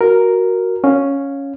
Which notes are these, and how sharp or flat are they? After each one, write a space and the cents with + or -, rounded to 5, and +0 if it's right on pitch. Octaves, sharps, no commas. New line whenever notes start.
F#4 +0 A#4 +0
C#4 +0 F5 +20